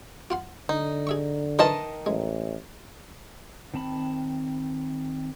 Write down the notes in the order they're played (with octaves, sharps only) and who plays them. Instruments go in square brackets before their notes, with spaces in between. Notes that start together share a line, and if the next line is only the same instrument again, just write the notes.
[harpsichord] F4 F#5 C6
[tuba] D3 [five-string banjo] D#4
[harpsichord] G#4 E5 C#6
[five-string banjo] D#3 D#5 A5 [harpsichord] E3 F4 A#4
[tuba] A1 [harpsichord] G#3
[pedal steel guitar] D#3 C4 A5 B5